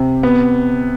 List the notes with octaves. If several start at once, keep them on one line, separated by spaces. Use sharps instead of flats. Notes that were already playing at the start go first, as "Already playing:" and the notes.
Already playing: C3
B3